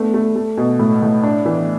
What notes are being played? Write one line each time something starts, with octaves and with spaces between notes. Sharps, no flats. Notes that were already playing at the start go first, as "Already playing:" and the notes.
Already playing: A3 B3 D4
A3
A3
B2
A2
A2
D4
E3